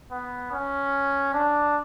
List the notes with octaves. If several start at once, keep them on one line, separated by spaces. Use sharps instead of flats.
B3
C#4
D4